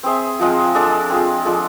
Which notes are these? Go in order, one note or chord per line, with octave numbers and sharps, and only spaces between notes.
C4 G#4 C5 E5
F3 G#3 C4 F4
G#3 D4 A4
C4 F4 G#4
F3 G#3 D4 A4